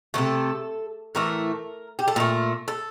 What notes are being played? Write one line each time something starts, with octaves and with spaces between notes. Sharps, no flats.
C3 E3 A3 A4
A2 E3 A3 A#4
G4
A4
A#2 A3 A#4
A4